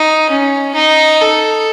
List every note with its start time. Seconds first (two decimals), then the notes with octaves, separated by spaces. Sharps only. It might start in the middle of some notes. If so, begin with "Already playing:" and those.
Already playing: D#4
0.30 C#4
0.75 D#4
1.20 A4